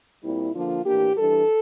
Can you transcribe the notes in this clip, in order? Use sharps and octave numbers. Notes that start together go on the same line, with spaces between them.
A#2 G3 C4 E4
D3 F3 A#3 D4 F4
A2 E3 A#3 D4 G4
E3 G3 D4 A4